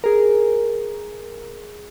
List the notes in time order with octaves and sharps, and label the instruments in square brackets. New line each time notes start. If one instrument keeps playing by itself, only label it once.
[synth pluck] G#4 A#4